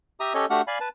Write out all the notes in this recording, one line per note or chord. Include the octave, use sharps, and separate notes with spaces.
G4 E5 A#5 D#6
C#4 G4 A4 C#5 D#5
A3 D4 F#4 G4 F#5 F6
D5 F5 G#5 B5
B4 A5